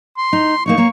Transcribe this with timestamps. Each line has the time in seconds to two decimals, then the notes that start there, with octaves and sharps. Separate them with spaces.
0.17 C6
0.33 D#4
0.66 A#3 D#4 C#5 C#6
0.77 A#3 C#5